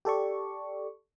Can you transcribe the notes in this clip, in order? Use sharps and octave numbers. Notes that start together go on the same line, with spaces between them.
G4 A4 D5 C#6